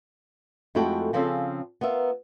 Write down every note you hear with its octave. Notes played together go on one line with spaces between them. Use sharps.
F2 G#3 A3 E4 F#4 G5
C#3 F3 C4 C#4 G#4 A4
B3 F4 A#4 E5